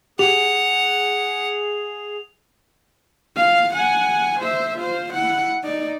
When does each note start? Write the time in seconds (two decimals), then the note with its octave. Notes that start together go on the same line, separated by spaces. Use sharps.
0.19 G4 G#4 F#5 F7
3.36 F4 F5
3.74 F#5 G#5
4.40 C5 E5
4.78 F4 C5
5.14 E4 F#5
5.63 D#4 D5